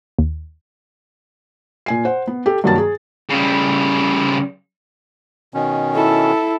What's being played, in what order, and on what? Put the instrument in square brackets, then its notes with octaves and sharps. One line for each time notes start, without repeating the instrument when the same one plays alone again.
[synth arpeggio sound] D#2
[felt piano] A#2 G#5 C7
C5 F#5
B3
G4 A4
G2 D#3 F#3 A#3 A5 A6
G#4
[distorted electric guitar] C#3 G3
[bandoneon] B2 D#3 C#4
[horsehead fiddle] E4 A4